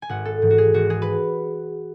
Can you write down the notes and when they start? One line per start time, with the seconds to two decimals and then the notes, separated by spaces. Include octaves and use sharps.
0.02 G#5
0.09 G#1 F#5
0.25 A4
0.42 G#2 E3
0.51 F#4
0.58 G#4
0.74 G#1 F#4
0.90 G#4
1.02 B4